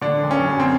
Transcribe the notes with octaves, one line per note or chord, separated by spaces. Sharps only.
D3 D4
F#1
C#4
F#2
C4